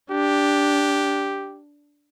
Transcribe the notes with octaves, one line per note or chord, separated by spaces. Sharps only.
D4 G4